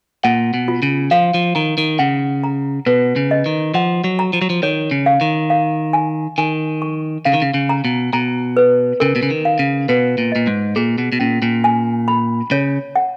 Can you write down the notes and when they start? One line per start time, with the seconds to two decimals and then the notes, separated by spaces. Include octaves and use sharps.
0.24 A#2 F#5
0.54 B2
0.68 F4
0.83 C#3
1.11 F3 F5
1.34 F3
1.55 D#3 A#5
1.78 D#3
1.99 C#3 F#5
2.44 A#5
2.87 B2 B4
3.16 C#3
3.31 D#5
3.46 D#3
3.74 F3 F#5
4.04 F#3
4.19 A#5
4.33 F3
4.42 F#3
4.50 F3
4.63 D#3 C#5
4.91 C#3
5.06 F5
5.21 D#3
5.50 F5
5.93 G#5
6.38 D#3 G#5
6.82 C#6
7.25 C#3 F5
7.34 D#3
7.42 C#3
7.54 C#3
7.69 A#5
7.85 B2
8.13 B2 A#5
8.57 B4
9.00 C#3 A#4
9.16 B2
9.23 C#3
9.30 D#3
9.45 F5
9.59 C#3
9.89 B2 B4
10.18 A#2
10.32 A#2 D#5
10.47 G#2
10.76 A#2 G#4
10.98 B2
11.12 B2
11.19 A#2 C#4
11.42 A#2
11.64 G#5
12.08 B5
12.51 C#3 C#5
12.96 F#5